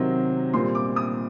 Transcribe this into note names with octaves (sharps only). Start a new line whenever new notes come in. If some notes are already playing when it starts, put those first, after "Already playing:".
Already playing: C3 D#3 F#3 C4
A#2 G3 C4 C6
D6
D#6